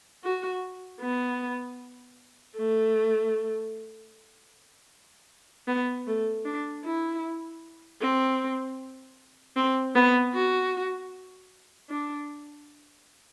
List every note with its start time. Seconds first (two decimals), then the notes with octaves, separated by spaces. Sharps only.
0.24 F#4
1.01 B3
2.57 A3
5.67 B3
6.07 A3
6.45 D4
6.84 E4
8.01 C4
9.56 C4
9.95 B3
10.34 F#4
11.89 D4